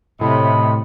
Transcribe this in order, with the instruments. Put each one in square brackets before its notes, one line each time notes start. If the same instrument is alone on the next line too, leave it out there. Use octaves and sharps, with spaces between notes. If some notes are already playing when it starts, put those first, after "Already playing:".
[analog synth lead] A2 [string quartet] C3 [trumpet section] D#5 B5